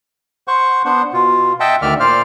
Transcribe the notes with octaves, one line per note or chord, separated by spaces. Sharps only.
C5 F#5 C#6
B3 D4 C5 F#5
B2 F4
D#5 E5 F#5 G5 A5
D2 D#3 D5 E5 F6
A#2 C5 D5 F5 F6